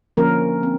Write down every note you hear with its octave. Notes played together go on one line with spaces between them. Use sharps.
D3 F3 A#3 C#4 A#4
C4